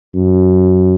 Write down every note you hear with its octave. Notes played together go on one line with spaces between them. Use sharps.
F#2